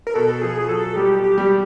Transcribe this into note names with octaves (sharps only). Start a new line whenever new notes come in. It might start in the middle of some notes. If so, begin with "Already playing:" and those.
A#4
B2 A4
F3 G#4
F#3 A4
G3 G4
G4
G3